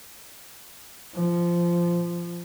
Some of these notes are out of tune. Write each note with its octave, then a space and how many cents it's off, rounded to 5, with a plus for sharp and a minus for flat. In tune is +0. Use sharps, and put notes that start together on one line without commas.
F3 -15